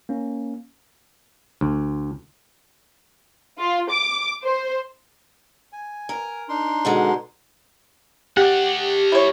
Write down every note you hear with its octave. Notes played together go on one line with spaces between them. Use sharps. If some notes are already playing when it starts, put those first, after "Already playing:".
A#3 C#4
D2
F4
D6
C5
G#5
A#4
D4 D#4 C6
B2 D3 D#3 G#3
A3 G4 D5 F#5
E4 C#5